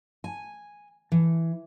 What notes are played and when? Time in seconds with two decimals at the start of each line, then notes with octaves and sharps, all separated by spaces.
0.24 G#5
1.12 E3